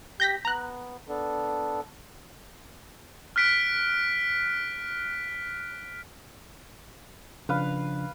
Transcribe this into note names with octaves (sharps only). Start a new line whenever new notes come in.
G4 G6 A#6 B6
B3 A#5 F#6
B3 D4 A4
F6 F#6 B6 D7
C#3 F3 D4 B4 F5